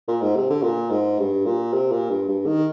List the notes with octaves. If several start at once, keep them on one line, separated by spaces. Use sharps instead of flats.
A#2
G#2
C3
D3
A#2
G#2
G2
A#2
C3
A#2
G2
G2
D#3